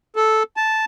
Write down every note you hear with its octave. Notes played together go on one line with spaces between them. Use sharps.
A4
A5